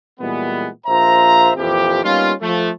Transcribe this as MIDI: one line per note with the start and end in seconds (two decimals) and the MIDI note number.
0.20 0.68 46
0.20 0.68 52
0.20 0.68 55
0.20 0.68 56
0.20 0.68 59
0.87 1.52 34
0.87 1.52 65
0.87 1.52 72
0.87 1.52 76
0.87 1.52 82
1.57 2.02 41
1.57 2.02 46
1.57 2.02 52
1.57 2.02 53
1.57 2.02 60
1.57 2.02 67
2.04 2.33 55
2.04 2.33 58
2.04 2.33 59
2.04 2.33 61
2.04 2.33 63
2.04 2.33 65
2.42 2.71 53
2.42 2.71 57